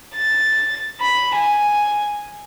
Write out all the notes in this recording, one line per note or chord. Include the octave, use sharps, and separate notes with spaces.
A6
B5
G#5